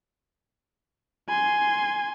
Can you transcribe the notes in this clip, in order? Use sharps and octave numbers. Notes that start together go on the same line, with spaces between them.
G#5 C6